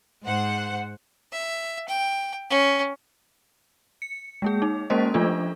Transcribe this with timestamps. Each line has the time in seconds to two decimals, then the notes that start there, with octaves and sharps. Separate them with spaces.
0.25 G#2 C5 F#5
1.32 E5
1.88 G5
2.50 C#4
4.02 C#7
4.42 G#3 A#3 G#4
4.62 D#4
4.90 G#3 A#3 C#4 A#4 C5 D#5
5.14 F3 A3 D4 F4 A4